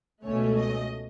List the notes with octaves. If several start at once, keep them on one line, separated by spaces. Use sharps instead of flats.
C#2 B2 A3 C#4 C#5
D#5